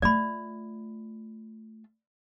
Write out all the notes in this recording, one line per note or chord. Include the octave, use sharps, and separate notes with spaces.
A3 F4 D5 B5